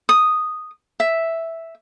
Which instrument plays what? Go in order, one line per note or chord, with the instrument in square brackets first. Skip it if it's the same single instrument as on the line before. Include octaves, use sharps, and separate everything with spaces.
[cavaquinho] D#6
E5